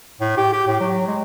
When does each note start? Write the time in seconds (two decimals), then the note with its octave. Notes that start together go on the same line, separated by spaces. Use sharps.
0.20 A2
0.37 G4
0.53 G4
0.67 A2
0.80 F#3
1.07 G#3